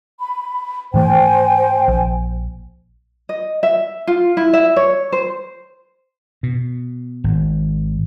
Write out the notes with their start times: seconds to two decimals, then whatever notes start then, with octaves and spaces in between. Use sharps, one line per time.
0.19 B5
0.94 G#2 E3 A3 C5 G5 G#5
1.88 A#1
3.29 D#5
3.63 E5
4.07 F4
4.37 E4
4.53 E5
4.76 C#5
5.12 C5
6.43 B2
7.24 G#1